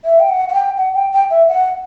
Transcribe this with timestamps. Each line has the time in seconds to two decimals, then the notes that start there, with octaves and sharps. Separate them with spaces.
0.05 E5
0.20 G5
0.29 F#5
0.49 F#5
0.53 G5
0.77 F#5
0.94 G5
1.12 G5
1.31 E5
1.48 F#5